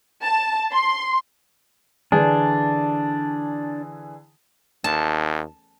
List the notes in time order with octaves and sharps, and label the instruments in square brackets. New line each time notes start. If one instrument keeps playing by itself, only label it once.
[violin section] A5
C6
[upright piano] D3 E3 G#4 [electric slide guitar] D4
[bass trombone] D#2 [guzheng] A5